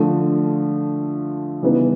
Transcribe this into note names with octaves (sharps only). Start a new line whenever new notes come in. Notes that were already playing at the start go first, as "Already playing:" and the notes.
Already playing: D3 F3 A3
C#3 E3 G3 B3 D#4